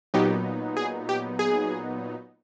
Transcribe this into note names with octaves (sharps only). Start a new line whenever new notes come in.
A#2 F#3 B3 D#4 G4
G#4
G4
G#4